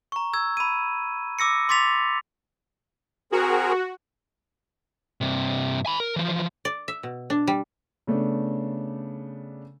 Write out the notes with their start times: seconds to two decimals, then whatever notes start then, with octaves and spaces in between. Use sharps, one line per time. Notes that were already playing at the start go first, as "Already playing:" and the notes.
0.12 A#5 C#6
0.33 E6 G#6
0.57 B5 D#7
1.39 D6 E6 A#6 C#7
1.69 C6 D6 A6 B6 F7
3.32 C4 F#4 G#4 A#4
5.21 G2 C3
5.86 G#5 B5
6.00 A#4
6.16 E3 F3
6.65 D5
6.88 E5
7.03 B2
7.30 D4
7.47 G3
8.07 C#3 A3 B3 D4